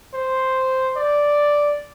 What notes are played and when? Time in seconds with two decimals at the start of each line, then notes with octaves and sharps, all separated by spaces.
0.14 C5
0.97 D5